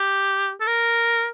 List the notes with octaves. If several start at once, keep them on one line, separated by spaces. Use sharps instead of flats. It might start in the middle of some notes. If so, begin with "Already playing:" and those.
Already playing: G4
A4
A#4